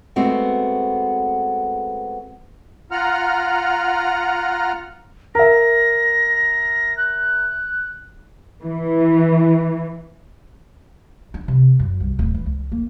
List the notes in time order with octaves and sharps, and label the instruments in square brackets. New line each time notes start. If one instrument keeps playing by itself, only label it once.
[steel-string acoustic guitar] G#3 A3 B3 C4 F#4
[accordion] F4 F#5 A#5 F6
[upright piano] A#4 E5 [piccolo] A#6
[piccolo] F#6
[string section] E3
[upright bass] D4
C3
F#2
C2
D1
E3
C#2
A#3